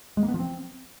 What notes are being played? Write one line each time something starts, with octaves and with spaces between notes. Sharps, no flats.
G#3
A#3
B3
F3
C4